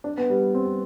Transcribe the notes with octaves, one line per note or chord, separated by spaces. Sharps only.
D4
B3
G3
C4